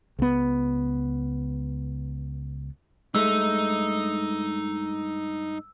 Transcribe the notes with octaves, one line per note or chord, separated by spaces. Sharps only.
C#2 B3
G2 G#3 A3 D#4 E6